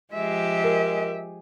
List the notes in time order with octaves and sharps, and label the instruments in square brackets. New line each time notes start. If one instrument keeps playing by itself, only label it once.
[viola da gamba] F3 G4 [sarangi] G#3 [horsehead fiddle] E5
[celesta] A#4